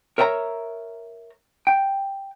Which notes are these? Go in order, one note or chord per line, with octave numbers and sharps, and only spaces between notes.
A#4 C#5 E5 G5 A#5
G5